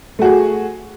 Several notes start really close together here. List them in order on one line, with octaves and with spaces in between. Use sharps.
A3 F#4 G#4